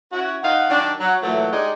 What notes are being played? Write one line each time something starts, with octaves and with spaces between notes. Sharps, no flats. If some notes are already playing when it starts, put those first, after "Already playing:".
C#4 E4 F#4
D#3 D#4 F5 F#5
D#3 F#3 D4
F#3
A#2 E3 F#3 A3
G#3 D4 D#4 G4 G#4